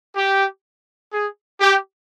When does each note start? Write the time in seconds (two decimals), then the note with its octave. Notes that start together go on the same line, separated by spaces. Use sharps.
0.17 G4
1.13 G#4
1.61 G4